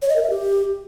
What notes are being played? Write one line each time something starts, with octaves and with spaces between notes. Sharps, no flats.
C#5
D#5
A#4
E5
G4